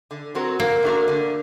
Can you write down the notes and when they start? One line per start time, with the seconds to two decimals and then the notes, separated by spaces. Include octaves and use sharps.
0.11 D3
0.35 F#3 C4 F#4 A#4
0.59 D3 A#3
0.83 A3 D4 F#4 A#4
1.08 D3